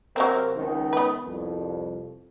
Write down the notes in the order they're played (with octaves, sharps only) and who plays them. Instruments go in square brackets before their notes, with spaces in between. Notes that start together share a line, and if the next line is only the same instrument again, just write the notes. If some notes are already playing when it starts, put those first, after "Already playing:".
[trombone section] C3 A#4 [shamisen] F#3 A#3 C4
[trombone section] C#2 D#3
[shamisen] B3 B4
[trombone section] C2 F2